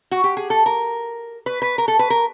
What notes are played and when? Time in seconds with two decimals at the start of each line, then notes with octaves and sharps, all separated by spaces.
0.11 F#4
0.24 G4
0.37 G#4
0.50 A4
0.66 A#4
1.46 B4
1.62 B4
1.78 A#4
1.88 A4
1.99 B4
2.10 A#4